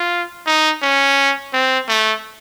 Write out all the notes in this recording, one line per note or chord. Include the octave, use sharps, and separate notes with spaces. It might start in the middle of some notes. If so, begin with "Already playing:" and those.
Already playing: F4
D#4
C#4
C4
A3